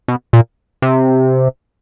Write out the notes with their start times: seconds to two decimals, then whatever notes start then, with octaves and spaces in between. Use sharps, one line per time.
0.08 B2
0.33 A#2
0.82 C3